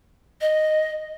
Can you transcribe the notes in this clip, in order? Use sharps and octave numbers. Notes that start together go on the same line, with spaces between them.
D#5